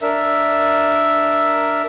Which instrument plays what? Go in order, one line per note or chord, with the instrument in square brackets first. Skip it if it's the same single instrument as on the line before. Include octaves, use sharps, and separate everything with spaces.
[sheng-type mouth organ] D4 A#4 E5